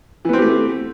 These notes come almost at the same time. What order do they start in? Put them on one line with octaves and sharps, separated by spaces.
E3 B3 C4 G4 A3